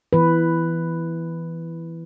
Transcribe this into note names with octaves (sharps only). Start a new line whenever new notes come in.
E3 B4